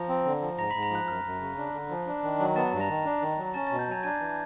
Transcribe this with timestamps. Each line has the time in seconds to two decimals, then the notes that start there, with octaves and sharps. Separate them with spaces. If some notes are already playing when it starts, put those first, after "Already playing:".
Already playing: F3 A#5 A#6
0.09 C4
0.25 D3
0.41 F3
0.57 G#2 A#5 A#6
0.70 G#2 B5 B6
0.83 A#5 A#6
0.91 F3 F#6
1.07 F#2 F6
1.24 F#2
1.41 C#3
1.57 D4
1.73 D3
1.90 F3
2.07 D4
2.23 D#3
2.39 F#3
2.56 B3 A5 A6
2.72 G2
2.80 A#5 A#6
2.89 D#3
3.05 D4
3.21 D#3
3.38 F#3
3.54 C#4 A5 A6
3.67 B2 A5 A6
3.79 G6
3.88 F#3 G#5 G#6
4.04 D4 G#5 G#6
4.20 E3